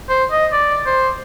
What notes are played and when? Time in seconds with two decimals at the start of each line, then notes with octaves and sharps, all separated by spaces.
0.09 C5
0.31 D#5
0.52 D5
0.86 C5